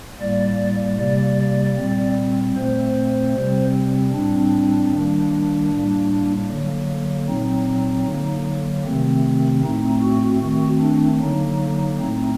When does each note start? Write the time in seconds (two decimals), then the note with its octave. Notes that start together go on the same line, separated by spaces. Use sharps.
0.20 A2 G3 A#3 D5
0.98 C3 G3 A#3 D5
1.77 A#2 G3 C4
2.55 A#2 A3 C4 C5
3.35 C3 G3 C4
4.13 A2 G3 C4 D4
4.92 D#3 G3 A#3
5.70 A2 G3 A#3
6.49 D3 F#3 A#3
7.27 A#2 F#3 C4 D#4
8.06 D3 F#3 A#3
8.85 C3 D#3 A3 C4
9.63 A2 A3 C4 D#4
10.02 F#4
10.42 D#3 A3 C4 F#4
10.80 D4
11.20 D3 F#3 A#3 D#4
11.99 A2 A3 C4